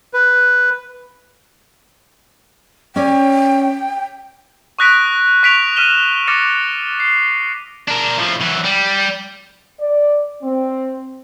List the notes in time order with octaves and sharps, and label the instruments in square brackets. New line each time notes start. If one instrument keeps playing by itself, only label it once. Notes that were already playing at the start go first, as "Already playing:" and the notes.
[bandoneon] B4
[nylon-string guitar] C#4 C#5 D5 [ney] G5
[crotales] C#6 D#6 F#6 A#6 B6 D7
C#6 B6 D7 F7
F6 B6 D#7 E7 G7
D6 F6 A6 A#6 C#7 E7
C7
[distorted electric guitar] D4 A#4
A2 F3
E3 F#3
G3
[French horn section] D5
C4